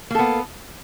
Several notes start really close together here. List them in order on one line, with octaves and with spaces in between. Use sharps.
A#3 A4 B3